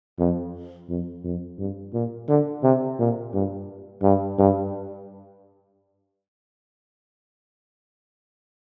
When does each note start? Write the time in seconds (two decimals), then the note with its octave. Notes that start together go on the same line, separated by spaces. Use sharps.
0.19 F2
0.89 F2
1.24 F2
1.58 G2
1.93 A#2
2.28 D3
2.63 C3
2.99 A#2
3.33 G2
4.02 G2
4.38 G2